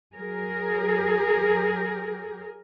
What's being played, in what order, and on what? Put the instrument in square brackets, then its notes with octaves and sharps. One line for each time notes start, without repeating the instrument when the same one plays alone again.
[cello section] F#3 G#4 A#4